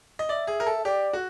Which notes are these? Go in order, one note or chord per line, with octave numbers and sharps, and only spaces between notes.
D#5
D5 E5
G#4
A#4
A4
G4 D5
F#4